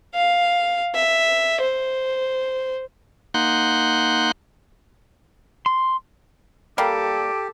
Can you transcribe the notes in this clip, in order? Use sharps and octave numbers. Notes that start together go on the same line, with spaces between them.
F5
E5
C5
A#3 D#4 F#5 C6 F#6 G6
C6
G3 A#3 G4 A4 D6